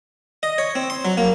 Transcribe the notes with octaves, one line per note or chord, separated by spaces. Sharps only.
D#5
C#5
C4
C6
F#3
A#3